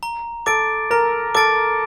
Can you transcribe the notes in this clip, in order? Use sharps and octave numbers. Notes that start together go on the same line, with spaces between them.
A#5
A4 D6 A6 D7
A#4 A#5
A4 D6 A6 D7